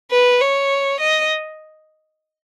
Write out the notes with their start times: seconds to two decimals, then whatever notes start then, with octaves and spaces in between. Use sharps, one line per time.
0.11 B4
0.41 C#5
1.00 D#5